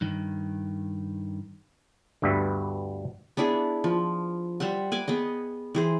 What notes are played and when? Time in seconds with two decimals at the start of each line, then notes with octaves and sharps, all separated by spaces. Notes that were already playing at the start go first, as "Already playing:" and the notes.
0.01 G2 D#3
2.22 D2 G2 G3 B3 E5
3.37 B3 D4 E4 G#4
3.84 F3
4.60 G3 C5 E5 F#5
4.92 B4 G#5 D6
5.08 B3 G#4 D#5
5.75 E3 G#4 C5